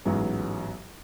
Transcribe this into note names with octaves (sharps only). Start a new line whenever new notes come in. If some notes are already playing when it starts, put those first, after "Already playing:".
A1 G#2 F#3 B3